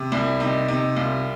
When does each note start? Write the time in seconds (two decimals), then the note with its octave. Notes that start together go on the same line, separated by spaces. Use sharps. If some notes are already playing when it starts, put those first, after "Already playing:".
Already playing: C3
0.12 C2 E4
0.40 C3 D#4
0.68 C3 D#4
0.96 C2 F4